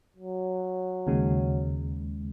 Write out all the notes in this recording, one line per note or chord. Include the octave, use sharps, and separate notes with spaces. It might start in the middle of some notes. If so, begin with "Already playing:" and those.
F#3
D#2 C#3 G#3